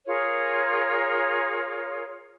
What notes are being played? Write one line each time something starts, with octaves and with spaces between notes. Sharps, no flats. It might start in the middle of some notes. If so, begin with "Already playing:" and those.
F4 G#4 A#4 C#5